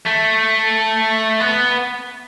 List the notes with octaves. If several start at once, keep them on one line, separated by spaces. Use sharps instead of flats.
A3
B3